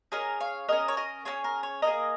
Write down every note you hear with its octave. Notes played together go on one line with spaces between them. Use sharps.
C#4 G#4 A#4 D#5
C#5 F5
C#4 G#4 A#4 D#5
C#5
A#4 D#5
C#4 F4 G#4 C#5
A#4
C#5
A#3 D#4 G#4 A#4 D#5